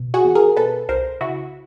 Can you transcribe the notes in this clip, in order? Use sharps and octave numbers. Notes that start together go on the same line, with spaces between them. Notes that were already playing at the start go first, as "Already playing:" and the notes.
Already playing: B2
F#4 G#4
E2
G#4 A#4
B2 A4 B4
C2 A#4 C5
C#3 E4 F#4